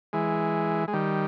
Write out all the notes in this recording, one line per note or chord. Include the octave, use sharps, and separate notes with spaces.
E3 G#3
G#3
D#3 G3